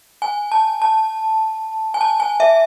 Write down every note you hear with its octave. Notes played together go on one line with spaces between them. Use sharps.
G#5
A5
A5
G#5
A5
G#5
E5